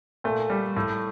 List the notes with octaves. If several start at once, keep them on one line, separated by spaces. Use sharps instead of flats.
A#2 A3
G3
A2